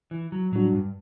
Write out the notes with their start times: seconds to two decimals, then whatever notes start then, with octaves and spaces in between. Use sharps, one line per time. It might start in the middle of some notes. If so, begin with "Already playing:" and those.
0.11 E3
0.32 F#3
0.52 A2 F#3 G3 D4 F#4
0.73 G2